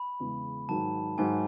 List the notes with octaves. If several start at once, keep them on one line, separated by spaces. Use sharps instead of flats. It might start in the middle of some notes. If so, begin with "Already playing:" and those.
Already playing: B5
E2 C#3 G#3
G#2 D#3 F#3 A5
G#2 D#3 F#3 G#5